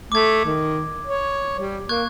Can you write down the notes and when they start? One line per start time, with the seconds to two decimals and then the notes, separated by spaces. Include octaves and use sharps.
0.12 A3 D6 G#6
0.45 D#3
1.06 C#5
1.58 G3
1.89 A#3 C#6 F#6 G#6